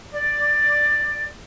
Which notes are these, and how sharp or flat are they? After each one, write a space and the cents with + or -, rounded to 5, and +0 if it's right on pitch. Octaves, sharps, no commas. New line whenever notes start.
D5 +10